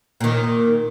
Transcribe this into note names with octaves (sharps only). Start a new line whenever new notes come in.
A#2 D#3